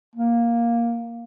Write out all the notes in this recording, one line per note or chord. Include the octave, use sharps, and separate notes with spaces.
A#3